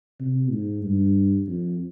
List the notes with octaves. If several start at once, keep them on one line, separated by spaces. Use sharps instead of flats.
C3
G#2
G2
F2